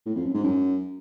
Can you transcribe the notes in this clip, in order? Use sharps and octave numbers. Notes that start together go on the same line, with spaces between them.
A2
F2
F#2
G#2
F#2